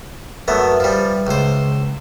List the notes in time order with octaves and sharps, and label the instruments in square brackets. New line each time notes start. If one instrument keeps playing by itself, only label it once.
[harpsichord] F#2 A3 B3 [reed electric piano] B4 E5
[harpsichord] F3 G3
C#2 C5